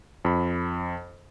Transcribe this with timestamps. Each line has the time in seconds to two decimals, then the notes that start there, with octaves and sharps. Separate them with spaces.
0.25 F2 B5